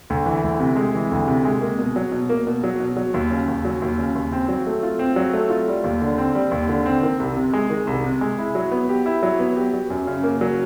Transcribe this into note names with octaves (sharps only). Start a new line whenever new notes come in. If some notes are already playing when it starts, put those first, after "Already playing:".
D2
E3
D2
C3
G#3
E3
D2
C3
G#3
A#3
B2
F#3
B2
A#3
B2
F#3
B2
F#3
D#2
C#3
D#2
F#3
D#2
C#3
D#2
C4
F#3
A3
F4
C4
F#3
A3
F4
G3
D#2
D3
C4
G3
D#2
D3
C4
D#3
C2
C3
G#3
D#3
C2
C3
G#3
E4
F#3
B3
G4
E4
F#3
B3
G4
F#3
F#2
C#3
A#3
F#3